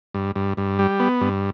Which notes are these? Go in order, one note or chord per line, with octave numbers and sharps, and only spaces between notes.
G2
G2
G2
G3
B3
G2